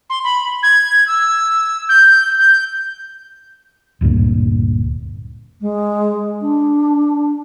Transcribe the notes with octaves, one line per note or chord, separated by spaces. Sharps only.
C6
B5
G#6
E6
G6
G6
D1 D2 G2 A#2
G#3
D4